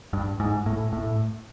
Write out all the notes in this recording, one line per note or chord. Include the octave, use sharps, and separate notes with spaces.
G2
G#2
A2
A2